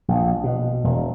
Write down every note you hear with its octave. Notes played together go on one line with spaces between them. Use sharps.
A#1
B2
E1